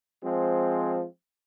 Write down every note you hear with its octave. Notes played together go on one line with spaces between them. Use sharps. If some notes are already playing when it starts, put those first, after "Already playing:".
F3 G#3 C4